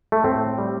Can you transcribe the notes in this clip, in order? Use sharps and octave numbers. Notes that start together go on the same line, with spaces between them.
A3
A2 C4
G3